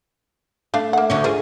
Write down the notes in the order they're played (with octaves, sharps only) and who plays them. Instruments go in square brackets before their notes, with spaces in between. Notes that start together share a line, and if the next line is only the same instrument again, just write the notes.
[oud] A3 [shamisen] D4 F5
[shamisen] A#3 F#5
[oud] D2 D3 C#5
[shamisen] F4 A#4 C5 [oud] G#4